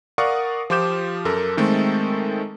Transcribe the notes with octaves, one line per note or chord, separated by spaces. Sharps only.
A#4 D5 F5 F#5 C#6 D#6
F3 F4 G4 D6 G6 E7
F#2 A4 A#4
D#3 G#3 A3 C4 A4